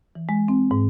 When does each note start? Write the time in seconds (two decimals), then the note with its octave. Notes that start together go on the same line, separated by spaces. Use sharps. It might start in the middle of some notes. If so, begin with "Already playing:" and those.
0.15 E3
0.29 G#3
0.48 C4
0.71 G#2